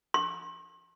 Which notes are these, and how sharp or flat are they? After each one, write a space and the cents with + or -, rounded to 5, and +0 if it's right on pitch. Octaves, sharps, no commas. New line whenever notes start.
C6 +45